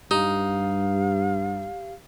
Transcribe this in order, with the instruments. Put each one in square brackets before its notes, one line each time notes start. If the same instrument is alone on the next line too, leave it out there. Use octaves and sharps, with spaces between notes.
[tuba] G2 [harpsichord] D#4 [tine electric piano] G4 [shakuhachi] F5